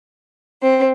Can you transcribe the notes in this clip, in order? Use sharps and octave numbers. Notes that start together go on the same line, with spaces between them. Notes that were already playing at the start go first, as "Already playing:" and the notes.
C4